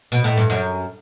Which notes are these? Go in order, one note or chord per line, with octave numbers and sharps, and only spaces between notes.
B2
A2
G2
F#2